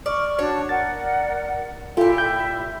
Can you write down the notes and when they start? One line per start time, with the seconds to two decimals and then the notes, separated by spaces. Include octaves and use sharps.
0.06 D5 C#6 F6
0.39 D4 F#4 C#5 A5
0.69 A#4 D5 F#5 A6
1.97 A#2 E4 F4 G4 A4 E5
2.18 G6